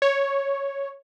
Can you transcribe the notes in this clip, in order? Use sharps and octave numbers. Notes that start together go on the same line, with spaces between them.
C#5